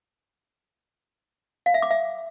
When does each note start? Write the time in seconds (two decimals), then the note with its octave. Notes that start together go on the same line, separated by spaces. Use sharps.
1.66 F5
1.74 E5
1.82 D6
1.91 E5